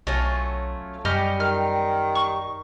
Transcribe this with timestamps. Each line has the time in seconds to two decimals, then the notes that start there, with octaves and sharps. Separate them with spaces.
0.07 B1 F#3 A3 C#4 F4
1.05 F#2 G3 C#4 G4 D#5 G5 F6
1.40 D#3 F6
2.15 C#6